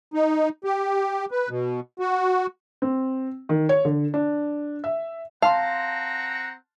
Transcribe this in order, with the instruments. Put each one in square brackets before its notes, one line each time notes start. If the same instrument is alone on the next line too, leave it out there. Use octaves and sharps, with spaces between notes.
[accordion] D#4
G4
B4
B2
F#4
[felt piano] C4
D#3
C#5
D3
D4
E5
[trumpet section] C4 F#5 A#5 [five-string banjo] F5 [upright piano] A5 C6